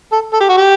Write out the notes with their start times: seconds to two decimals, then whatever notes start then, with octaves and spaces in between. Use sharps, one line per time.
0.12 A4
0.34 A4
0.41 G4
0.49 F#4
0.58 G4